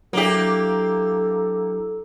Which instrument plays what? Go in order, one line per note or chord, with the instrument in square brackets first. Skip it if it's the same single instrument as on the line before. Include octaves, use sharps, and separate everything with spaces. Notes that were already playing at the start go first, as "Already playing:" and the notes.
[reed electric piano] F#3 D4 E4 [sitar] A#3 G4 [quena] A4